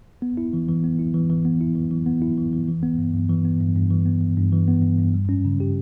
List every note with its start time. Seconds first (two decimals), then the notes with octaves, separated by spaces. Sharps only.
0.22 B3
0.37 E4
0.53 E3
0.69 E3
0.84 B3
0.99 E4
1.14 E3
1.30 E3
1.45 B3
1.61 E4
1.76 E3
1.91 E3
2.06 B3
2.22 E4
2.37 E3
2.53 E3
2.68 E3
2.83 B3
2.98 G2
3.14 G2
3.29 E3
3.45 B3
3.60 G2
3.76 G2
3.91 E3
4.06 B3
4.21 G2
4.37 G2
4.53 E3
4.68 B3
4.82 G2
4.98 G2
5.14 G3
5.29 C#4
5.45 C#3
5.60 G4